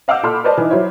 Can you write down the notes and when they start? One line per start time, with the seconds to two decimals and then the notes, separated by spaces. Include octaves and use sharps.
0.08 D#5 F5 F#5 D6 E6 G6
0.23 A#2 A4 B5 C6 F6
0.44 B4 C5 D5 D#5 A5 B5
0.58 E3 D#4
0.70 F#3 E4 C5 C#5 E5